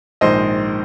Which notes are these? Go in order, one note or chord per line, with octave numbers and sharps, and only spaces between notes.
A#1 G#2 D#3 C5 D#5